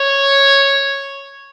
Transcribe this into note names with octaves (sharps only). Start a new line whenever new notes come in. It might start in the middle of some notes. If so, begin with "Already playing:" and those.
Already playing: C#5